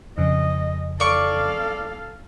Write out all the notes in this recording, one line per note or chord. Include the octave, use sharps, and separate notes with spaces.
F2 C#3 D#5
A4 D5 F5 C#6